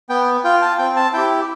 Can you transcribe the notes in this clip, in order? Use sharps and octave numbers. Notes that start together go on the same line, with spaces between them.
B3 G5
F4 G5
A5
C4 G5
A5
E4 G4 G5